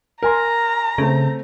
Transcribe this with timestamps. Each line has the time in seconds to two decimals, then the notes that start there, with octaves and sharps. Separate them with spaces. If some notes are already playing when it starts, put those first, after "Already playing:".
0.23 A#4 G#5 A#5 C6
0.98 C#3 A3 C4